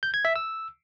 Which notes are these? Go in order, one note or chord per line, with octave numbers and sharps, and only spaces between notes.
G6
G#6
E5
E6